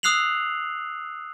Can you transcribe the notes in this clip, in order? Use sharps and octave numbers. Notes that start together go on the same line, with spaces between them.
D#6 E6 F#6 C7 F7 F#7